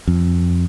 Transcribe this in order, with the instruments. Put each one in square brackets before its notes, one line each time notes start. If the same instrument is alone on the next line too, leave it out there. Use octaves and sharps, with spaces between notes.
[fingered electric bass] F2